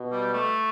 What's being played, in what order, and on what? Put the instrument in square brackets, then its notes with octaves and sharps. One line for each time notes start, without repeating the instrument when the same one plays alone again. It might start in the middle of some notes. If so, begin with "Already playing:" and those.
Already playing: [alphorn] B2
[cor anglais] G3
A3